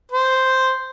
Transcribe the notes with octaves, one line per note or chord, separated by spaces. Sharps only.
C5